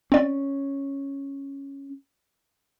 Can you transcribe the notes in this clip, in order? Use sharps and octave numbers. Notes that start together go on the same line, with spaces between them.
C4 C#4 D5